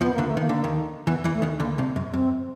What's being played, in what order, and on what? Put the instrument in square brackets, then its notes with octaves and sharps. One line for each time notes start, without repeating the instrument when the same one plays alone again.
[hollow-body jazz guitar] F2 F3 [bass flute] B3
[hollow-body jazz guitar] D2 D3 [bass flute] A#3
[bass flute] A3
[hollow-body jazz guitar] D#3 [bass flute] A#3
[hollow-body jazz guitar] D3
D#2 D#3
[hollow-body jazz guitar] E2 E3 [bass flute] B3
[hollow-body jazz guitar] E2 E3
[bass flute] A3
[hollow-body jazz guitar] D#2 D#3
[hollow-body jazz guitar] D2 D3 [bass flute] A#3
[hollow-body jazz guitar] C2 C3
F#2
[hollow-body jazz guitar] F#2 [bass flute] C4